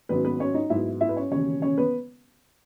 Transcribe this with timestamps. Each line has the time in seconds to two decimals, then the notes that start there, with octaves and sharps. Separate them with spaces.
0.09 G#1 G#2 F#3 B3 C#4 B4
0.25 B3 B4
0.40 C#4 C#5
0.54 D#4 D#5
0.70 G#2 F#3 B3 E4 E5
1.01 E4 E5
1.09 B4
1.16 C#4 C#5
1.31 E1 D#2 C#3 C#4 C#5
1.62 C#4 C#5
1.78 B3 B4